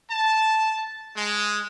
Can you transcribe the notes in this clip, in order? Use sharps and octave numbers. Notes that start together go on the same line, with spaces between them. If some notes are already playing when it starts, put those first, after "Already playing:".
A5
G#3